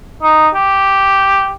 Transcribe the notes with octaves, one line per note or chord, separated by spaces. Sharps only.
D#4
G4